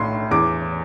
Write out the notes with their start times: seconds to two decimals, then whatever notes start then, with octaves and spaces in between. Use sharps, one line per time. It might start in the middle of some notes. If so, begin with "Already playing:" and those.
Already playing: B1 A2 C6
0.31 E2 D6